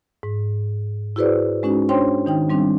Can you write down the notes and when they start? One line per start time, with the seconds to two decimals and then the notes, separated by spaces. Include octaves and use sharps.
0.23 G#2
1.16 E4 F#4 G#4 B4 C5 D5
1.63 G#3 C#4 D#4 F#4
1.89 C#4 D4 C5 C#5 G5 C6
2.26 D#3 D#4 G5
2.50 G3 C4 D4